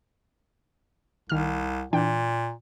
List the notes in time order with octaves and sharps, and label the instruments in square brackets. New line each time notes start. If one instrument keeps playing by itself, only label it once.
[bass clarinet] C2 [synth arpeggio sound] D#3 F6
[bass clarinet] A#2 [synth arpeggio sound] E3 D4 G5